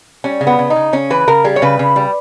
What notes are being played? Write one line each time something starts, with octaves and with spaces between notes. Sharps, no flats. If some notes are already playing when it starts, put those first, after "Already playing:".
G3 C#4
C#3
B3
C#3
D#4
C#3
C#3 C#4
E3 B4
C#3 A#4
G3 G#4
C#5
C#3 B4
C#3
G3